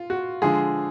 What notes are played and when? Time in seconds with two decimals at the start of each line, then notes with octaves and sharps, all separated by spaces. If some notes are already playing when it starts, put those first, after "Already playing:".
Already playing: F4
0.10 F#4
0.42 D3 F3 G#3 G#4